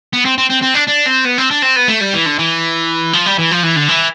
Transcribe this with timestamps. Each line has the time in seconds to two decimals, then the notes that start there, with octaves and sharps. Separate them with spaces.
0.13 B3
0.25 C4
0.38 C4
0.50 C4
0.63 C4
0.75 D4
0.88 D4
1.07 C4
1.25 B3
1.38 C4
1.51 D4
1.63 C4
1.76 B3
1.88 A3
2.01 G3
2.13 E3
2.26 D3
2.38 E3
3.13 F3
3.26 G3
3.39 E3
3.51 F3
3.63 E3
3.76 D3
3.88 E3